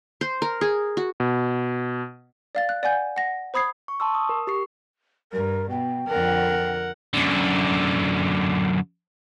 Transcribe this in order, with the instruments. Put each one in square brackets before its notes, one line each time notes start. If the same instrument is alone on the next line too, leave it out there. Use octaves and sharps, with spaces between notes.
[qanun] C5
A#4
G#4
F#4
[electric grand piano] B2
[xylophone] D5 F5 A6
F#6
D5 F#5 G#5 G6
F#5 A#6
C5 B5 D#6 G#6 C7
[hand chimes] C#6
A5 C6 C#6 E6
D#6
A#4
G4 C#6 C7
[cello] G2 [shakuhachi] A#4
[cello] B2 [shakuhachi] G5
[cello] F2 D3 [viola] A#4 F#5
[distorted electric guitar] F#2 D3